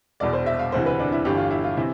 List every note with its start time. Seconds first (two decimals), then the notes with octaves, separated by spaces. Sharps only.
0.20 E1 E2 B2 D5
0.33 C5
0.46 E5
0.59 F5
0.72 E1 D2 C3 E3 C5
0.86 B4
0.99 D4
1.12 E4
1.25 G1 G2 E3 G4
1.37 F4
1.50 E4
1.64 F4
1.77 C3 E3 E4